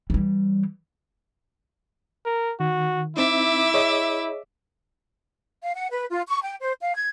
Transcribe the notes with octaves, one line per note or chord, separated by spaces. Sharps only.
E3 G3
A#4
D#3 F#4
C4 D#4 E4 E5 D6
G#4 C#5 D#5
F5
F#5
B4
F4
C#6
G5
C5
F5
G#6